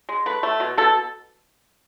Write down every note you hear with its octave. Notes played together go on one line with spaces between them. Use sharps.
G#3
A3 B4
A3
B2
B2 A4